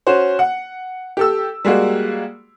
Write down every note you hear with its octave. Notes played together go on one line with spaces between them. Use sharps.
C#4 F#4 C5
F#5
G4 A4 E6
G3 G#3 A#3 F#4